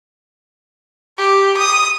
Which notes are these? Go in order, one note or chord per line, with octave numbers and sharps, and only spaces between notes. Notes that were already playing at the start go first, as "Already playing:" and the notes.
G4
D#6